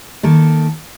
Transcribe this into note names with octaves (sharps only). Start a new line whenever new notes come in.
D#3 A#3 A4